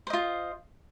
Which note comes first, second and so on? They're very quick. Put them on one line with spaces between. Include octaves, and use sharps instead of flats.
C5 D#5 F4